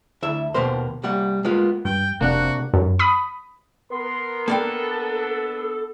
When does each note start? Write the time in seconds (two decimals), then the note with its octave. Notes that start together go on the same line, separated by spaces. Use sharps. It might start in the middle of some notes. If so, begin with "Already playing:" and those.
0.22 D2 E4 E5
0.54 D#2 B2 A#3 B3 A#4 C5
1.03 C2 G3 A#3 F#5
1.45 G#3 A#3 B3 F4
1.85 G2 G5
2.21 F1 C3 A#3 D4 F#4 F#5
2.74 F#2
2.99 B5 D#6
3.92 B3 A#4 C6
4.48 A#3 B3 D4 A4 D5 G5